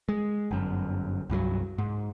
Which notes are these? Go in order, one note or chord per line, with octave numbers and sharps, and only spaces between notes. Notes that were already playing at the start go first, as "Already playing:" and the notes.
G#3
G1 F#2
C2 G2 E3 F#3
G#2